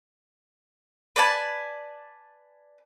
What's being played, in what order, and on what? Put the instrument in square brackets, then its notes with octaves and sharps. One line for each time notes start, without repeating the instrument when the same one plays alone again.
[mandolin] B4 D5 G#5 A5